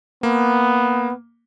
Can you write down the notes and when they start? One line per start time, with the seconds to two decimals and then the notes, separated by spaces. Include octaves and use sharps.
0.23 A#3 B3